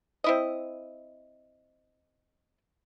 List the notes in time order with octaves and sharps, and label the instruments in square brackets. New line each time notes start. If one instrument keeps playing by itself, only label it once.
[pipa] C4 E4 D#5